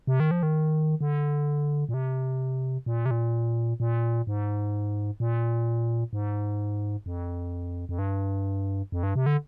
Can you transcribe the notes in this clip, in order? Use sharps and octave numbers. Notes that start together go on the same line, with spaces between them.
C3
D#3
F3
D#3
D3
A#2
C3
A#2
C3
A#2
A#2
G#2
A#2
G#2
F2
F2
G2
F2
G2
C3
D3